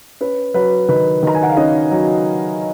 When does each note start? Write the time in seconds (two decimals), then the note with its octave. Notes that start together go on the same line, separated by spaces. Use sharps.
0.21 C#4 B4
0.54 F#3 B4
0.89 D#3 B4
1.23 D#3 A#5
1.35 G#5
1.42 F#5
1.49 F5
1.56 C#4 D#4 D#5
1.91 F#3